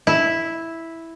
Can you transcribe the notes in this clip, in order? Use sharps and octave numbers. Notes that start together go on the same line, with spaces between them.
E4